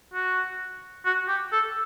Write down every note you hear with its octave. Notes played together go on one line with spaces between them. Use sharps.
F#4
F#4
G4
A4